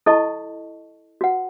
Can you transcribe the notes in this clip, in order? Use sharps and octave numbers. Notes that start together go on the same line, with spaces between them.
E4 A4 D#5 A5 C#6
F#4 B4 F#5